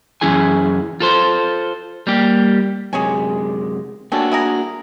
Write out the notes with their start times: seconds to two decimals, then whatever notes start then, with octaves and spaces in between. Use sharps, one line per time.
0.21 F#2 E3 C#4 E4 G#4 G#5
1.00 F4 A4 C5
2.07 G3 A#3 G4
2.93 F#2 C3 G#3 G#4 C#5 G#5
4.12 G3 A#3 C#4 D4 F#4 A4
4.32 E4 G#4 A#4